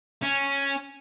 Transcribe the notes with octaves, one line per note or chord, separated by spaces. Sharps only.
C#4